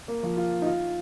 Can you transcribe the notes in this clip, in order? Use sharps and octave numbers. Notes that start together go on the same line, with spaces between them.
A#3
F3
F4
D#4
F4